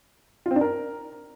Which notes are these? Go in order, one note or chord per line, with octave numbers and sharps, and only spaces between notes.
F4
C4
D4
A#4